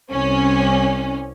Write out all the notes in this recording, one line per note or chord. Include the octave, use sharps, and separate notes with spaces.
C2 C#4